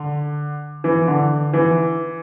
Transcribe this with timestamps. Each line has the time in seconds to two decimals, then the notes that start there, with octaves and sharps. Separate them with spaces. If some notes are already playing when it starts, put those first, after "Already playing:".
Already playing: D3
0.84 E3
1.08 D3
1.53 E3